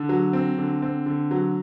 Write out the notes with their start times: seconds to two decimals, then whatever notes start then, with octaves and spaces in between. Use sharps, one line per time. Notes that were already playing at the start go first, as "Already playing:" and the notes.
Already playing: D3
0.09 F#3
0.33 C4
0.58 D3
0.82 C4
1.06 D3
1.31 F#3